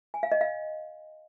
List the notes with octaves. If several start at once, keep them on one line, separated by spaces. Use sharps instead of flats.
G#5
F5
D#5
F5